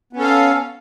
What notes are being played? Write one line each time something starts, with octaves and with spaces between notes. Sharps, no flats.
B3 C#4 A4 F5